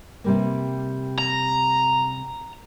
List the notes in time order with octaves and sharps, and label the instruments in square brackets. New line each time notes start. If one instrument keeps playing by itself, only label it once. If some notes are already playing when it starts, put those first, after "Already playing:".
[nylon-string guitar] C3 G3 A#3
[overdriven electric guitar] A#5